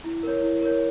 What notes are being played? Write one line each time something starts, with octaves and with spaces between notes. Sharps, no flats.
E4
A#4 C#5
E4
A#4 C#5